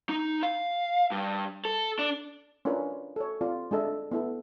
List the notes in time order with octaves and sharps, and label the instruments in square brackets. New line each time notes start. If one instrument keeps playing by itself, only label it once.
[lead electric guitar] D#4
F5
G2
A4
D4
[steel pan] C#4 D4 F4 A#4 B4
A4 C#5
C4 F4 A4 D5
G#3 D4 A4 D#5 E5
B3 E4 A4